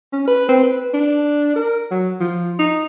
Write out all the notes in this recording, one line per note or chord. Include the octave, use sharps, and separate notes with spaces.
C#4
B4
C4
B4
D4
A#4
F#3
F3
D#4